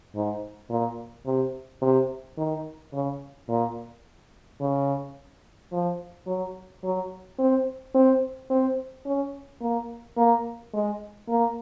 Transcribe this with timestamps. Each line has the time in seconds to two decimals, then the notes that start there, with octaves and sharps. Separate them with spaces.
0.15 G#2
0.70 A#2
1.26 C3
1.82 C3
2.37 D#3
2.93 C#3
3.49 A#2
4.61 C#3
5.72 F3
6.27 F#3
6.83 F#3
7.39 C4
7.95 C4
8.50 C4
9.06 C#4
9.61 A#3
10.17 A#3
10.74 G#3
11.29 A#3